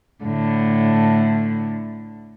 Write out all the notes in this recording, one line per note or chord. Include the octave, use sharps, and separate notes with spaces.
A2 D3